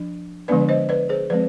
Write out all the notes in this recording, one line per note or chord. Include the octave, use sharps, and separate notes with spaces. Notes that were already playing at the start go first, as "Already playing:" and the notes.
Already playing: F3 D4
D3 F3 G#3 B3 D4 B4 D5
C5 D#5
B4 D5
G#4 C5
F3 G#3 C4 B4 D5